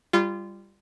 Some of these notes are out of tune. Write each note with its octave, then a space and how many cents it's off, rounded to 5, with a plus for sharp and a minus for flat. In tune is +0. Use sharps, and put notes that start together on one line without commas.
G3 +15 F4 -20